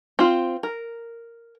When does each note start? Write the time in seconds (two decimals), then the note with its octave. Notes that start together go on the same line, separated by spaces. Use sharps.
0.19 C4 F4
0.63 A#4